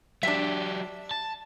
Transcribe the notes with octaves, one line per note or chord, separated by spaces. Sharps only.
F#3 D4 G4 E5
A5